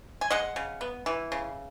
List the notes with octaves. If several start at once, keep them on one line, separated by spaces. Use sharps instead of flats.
G#5
G#3 D#5 F#5
C#3
B3
E3
C#3